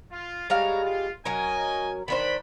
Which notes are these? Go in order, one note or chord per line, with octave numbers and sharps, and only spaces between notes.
F4
G3 G#3 B3 C#5 F5 A#5
F4
F#3 C#4 A#4 D#5 G#5
D#3 D4 C5 B5